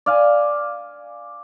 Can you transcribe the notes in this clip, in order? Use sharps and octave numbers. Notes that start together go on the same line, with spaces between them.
D5 F5 G#5